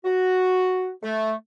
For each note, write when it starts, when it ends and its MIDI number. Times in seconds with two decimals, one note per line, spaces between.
0.05 0.90 66
1.03 1.32 57